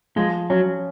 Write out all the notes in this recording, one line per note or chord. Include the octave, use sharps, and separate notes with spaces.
F3 G#3
F#3 C#4